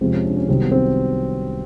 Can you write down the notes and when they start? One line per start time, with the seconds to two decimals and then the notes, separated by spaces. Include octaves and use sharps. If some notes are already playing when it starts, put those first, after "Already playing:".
0.01 F2 C3 F3 G#3 C4
0.13 C#4
0.25 D4
0.37 C#4
0.48 C2 C3 D#3 F#3 C4
0.61 B3
0.72 C4